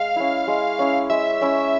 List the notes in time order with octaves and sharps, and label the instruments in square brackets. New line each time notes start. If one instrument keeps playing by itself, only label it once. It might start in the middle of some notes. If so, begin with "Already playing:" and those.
Already playing: [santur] G#3 [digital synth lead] F5
[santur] C#4 E4
G#3
C#4 E4
[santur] G#3 [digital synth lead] E5
[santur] C#4 E4